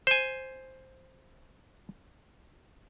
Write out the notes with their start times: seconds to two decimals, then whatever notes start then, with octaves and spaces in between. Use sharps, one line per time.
0.07 C5 G#5